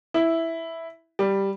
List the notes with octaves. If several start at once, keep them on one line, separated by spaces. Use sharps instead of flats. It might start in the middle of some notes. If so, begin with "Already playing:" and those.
E4
G3